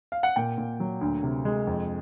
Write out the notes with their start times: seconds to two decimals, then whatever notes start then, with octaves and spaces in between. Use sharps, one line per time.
0.12 F5
0.23 F#5
0.36 A#2 G5
0.58 A#2
0.80 F#3
1.01 D2
1.23 C3
1.45 G#3
1.67 F2